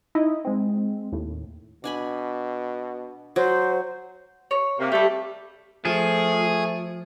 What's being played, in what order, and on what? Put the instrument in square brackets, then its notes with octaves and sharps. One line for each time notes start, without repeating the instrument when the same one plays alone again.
[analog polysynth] D#4 E4 D#5
G#3 C4
D#2 A2
[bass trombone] B2 [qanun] D4 G#5 B5
[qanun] F#3 [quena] C5
[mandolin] C#5
[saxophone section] C3 A#3
[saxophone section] G3 A3 [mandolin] G4 A4
[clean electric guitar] F3 [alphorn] A3 [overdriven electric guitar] G#4